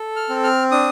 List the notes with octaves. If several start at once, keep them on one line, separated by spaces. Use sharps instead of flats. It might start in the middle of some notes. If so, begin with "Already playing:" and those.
Already playing: A4
F6
C4
F6
D4 D#6